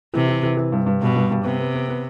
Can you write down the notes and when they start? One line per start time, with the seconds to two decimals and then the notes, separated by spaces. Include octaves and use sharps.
0.14 C3 E3
0.29 E3
0.43 E3
0.57 E3
0.72 G2
0.86 G2
1.02 G2 B2
1.15 G2
1.31 G2
1.45 C3 B3
1.60 B3
1.74 B3
1.89 B3